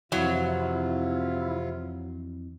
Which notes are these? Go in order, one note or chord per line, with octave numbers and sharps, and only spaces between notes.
F2 C3 E3 F#3 E4 F4